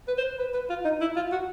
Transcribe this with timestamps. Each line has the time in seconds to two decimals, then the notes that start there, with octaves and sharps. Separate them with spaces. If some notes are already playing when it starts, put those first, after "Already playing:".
0.08 B4
0.18 C5
0.39 B4
0.54 B4
0.70 F4
0.85 D#4
1.01 E4
1.16 F4
1.32 F#4